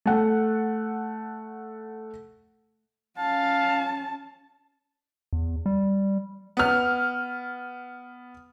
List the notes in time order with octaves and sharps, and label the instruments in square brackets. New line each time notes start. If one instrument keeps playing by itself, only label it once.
[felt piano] A3 F#5
[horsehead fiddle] C#4 A5 [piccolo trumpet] F5
[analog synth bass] E2
G3
[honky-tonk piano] B3 F6